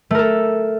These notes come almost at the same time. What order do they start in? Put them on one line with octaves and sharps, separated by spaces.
A3 A#4 A4